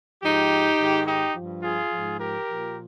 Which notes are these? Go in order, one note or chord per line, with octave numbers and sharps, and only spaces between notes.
G#2 F3 D#4 G4
G#2 D#3
D#4 G4
G2 F3
F4 G#4
G#2 F3
G4 A#4
A#2 F3